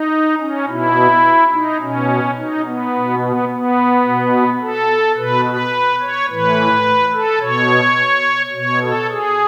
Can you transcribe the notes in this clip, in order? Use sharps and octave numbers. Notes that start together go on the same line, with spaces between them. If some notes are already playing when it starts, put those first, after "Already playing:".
Already playing: D#4
C#4
B2 E4
D#4
B2 C#4
D#4
B3
B2
B3
B3
B2
A4
B2 B4
B4
C#5
A2 E3 B4
A4
B2 C#5
B2 C#5
A4
G#4